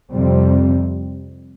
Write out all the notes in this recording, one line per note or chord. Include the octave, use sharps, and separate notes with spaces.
F2 C3 G3 C4